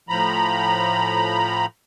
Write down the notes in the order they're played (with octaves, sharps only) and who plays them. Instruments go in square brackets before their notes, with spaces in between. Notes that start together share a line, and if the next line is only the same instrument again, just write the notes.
[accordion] A2 F3 A#5 B5